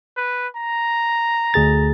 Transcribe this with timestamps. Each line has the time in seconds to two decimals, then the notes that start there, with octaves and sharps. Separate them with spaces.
0.17 B4
0.56 A#5
1.54 D2 G#4 A6